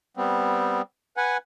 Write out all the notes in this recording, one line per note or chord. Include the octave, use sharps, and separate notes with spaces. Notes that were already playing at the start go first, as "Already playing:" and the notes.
G3 B3 C4
B4 F#5 G#5